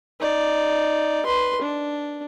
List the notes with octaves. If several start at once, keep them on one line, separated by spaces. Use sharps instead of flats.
D#4 D5
B4 C6
D4